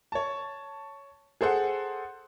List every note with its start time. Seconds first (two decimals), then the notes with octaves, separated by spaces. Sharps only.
0.12 C#5 A5
1.41 G#4 A4 C5 F#5